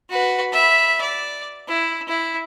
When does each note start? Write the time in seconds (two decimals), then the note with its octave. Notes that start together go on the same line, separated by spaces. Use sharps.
0.10 F#4 B4
0.53 E5 B5
1.02 D5
1.68 E4
2.09 E4